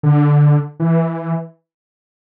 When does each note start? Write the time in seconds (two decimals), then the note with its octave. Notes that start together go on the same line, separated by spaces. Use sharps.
0.03 D3
0.80 E3